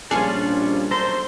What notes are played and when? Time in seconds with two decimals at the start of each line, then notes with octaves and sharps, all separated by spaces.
0.11 A#1 G3 C#4 D4 F4 G#4
0.91 B1 A4 C5 A#5